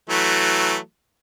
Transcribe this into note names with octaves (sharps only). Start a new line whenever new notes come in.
E3 F#3 A3